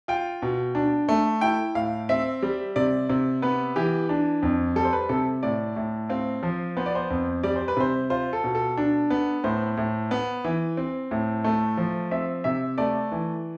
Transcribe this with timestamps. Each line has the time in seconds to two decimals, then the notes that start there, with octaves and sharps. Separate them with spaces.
0.08 F4 G5
0.42 B2
0.75 D4
1.09 A3
1.41 E4 G5
1.75 A2 F5
2.09 C4 E5
2.43 G3
2.76 C3 D5
3.09 C3
3.42 B3 B4
3.76 E3 G4
4.09 D4
4.43 F2
4.76 G3 A4
4.85 C5
4.93 B4
5.09 C3 A4
5.43 A2 D5
5.76 A2
6.09 C4 F5
6.43 F3
6.77 B3 C5
6.86 D5
6.95 C5
7.10 F2
7.43 G3 D5
7.56 C5
7.68 B4
7.77 C3 C5
8.10 F4 C5
8.33 A4
8.44 B2
8.55 A4
8.77 D4
9.10 B3
9.44 A2 C5
9.77 A2
10.11 B3
10.45 E3
10.77 C4
11.11 A2
11.44 A3
11.77 F3
12.11 C4 E5
12.44 C3 E5
12.78 A3 D5
13.12 E3